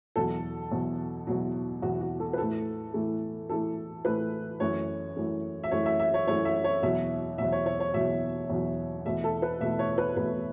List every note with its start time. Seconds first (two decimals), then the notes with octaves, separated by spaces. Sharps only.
0.16 E2 B2 F#3 A4
0.71 E2 B2 F#3
1.27 E2 B2 F#3
1.82 E2 B2 F#3 F#4
2.01 F#4
2.20 A4
2.33 B4
2.38 A2 E3 A3 A4
2.94 A2 E3 A3
3.49 A2 E3 A3 A4
4.05 A2 E3 A3 B4
4.60 F#2 E3 A3 C#5
5.16 F#2 E3 A3
5.64 E5
5.71 F#2 E3 A3 C#5
5.86 E5
5.99 E5
6.14 C#5
6.27 F#2 E3 A3 C#5
6.45 E5
6.64 C#5
6.83 E2 B2 F#3 E5
7.38 E2 B2 F#3 E5
7.52 C#5
7.66 C#5
7.80 C#5
7.94 E2 B2 F#3 E5
8.50 E2 B2 F#3
9.05 E2 B2 A3 E5
9.24 A4
9.42 B4
9.61 E2 B2 A3 E5
9.79 C#5
9.98 B4
10.16 E2 B2 A3 B4